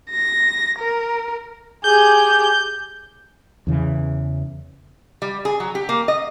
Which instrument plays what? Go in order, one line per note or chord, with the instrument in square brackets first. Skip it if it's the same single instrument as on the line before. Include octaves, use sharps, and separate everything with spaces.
[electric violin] A#6
A#4
[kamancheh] G4 G#4 [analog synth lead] G6
[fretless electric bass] E2 C#3 E3
[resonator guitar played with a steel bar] G3
G#4
F#3
G4
A#3
D#5